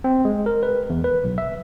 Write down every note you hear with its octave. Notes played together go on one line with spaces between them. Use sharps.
C4
G#3
A#4
B4
E2
B4
B1
E5